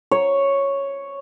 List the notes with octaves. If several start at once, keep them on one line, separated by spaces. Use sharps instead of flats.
C#5